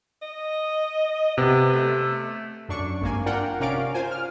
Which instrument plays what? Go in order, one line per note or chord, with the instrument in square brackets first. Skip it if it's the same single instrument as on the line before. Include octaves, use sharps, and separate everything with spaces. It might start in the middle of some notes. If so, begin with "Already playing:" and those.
[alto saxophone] D#5
[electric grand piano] C3 [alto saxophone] B3
[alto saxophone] A3
[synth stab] F#2 D4 C#6
G#1 G2 A#3 G#5
D4 F4 A#4 F#5 G5
C3 C#4 A#4 D5 F5 D7
F4 C5 G#5
F6